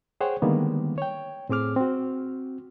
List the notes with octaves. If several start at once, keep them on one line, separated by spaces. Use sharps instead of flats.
G#4 C5 C#5 F#5 G5
D3 D#3 G3 G#3 A#3 B3
C#5 G5
A2 C4 G#4 D6 F6
C4 F#4